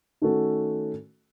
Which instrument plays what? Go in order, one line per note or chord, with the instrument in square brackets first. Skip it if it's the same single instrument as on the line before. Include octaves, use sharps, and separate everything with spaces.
[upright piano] D#3 A3 C#4 F#4 A4